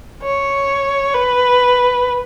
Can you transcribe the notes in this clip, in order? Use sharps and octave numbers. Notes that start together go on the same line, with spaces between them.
C#5
B4